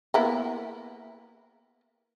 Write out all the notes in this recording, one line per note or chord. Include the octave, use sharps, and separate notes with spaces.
A#3 B3 E4